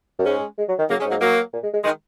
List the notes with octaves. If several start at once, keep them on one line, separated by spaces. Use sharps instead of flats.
F#2
G#2 G#3 C#4
G#3
F#3
D#3
C#3 F#3 A#3
G#3 C#4
G#2
F#3 A#3
F#3 A#3
A#2
G#3
G#3
D#3 G#3